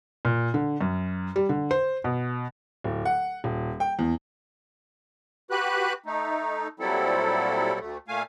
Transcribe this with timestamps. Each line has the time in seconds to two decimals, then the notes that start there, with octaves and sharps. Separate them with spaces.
0.25 A#2
0.54 D3
0.81 F#2
1.36 G3
1.49 D3
1.71 C5
2.04 B2
2.84 D1
3.05 F#5
3.44 D#1
3.80 G5
3.99 E2
5.51 F#4 G4 B4 B5 F#6
6.06 A3 D#4
6.80 A#2 F#3 G3 C4 E4 A4
7.79 D2 A3
8.08 A#2 A3 F5 G#5